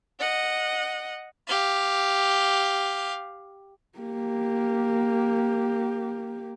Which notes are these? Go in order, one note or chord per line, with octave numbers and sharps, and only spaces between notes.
D#5 F#5
G4 F5
A#3 G4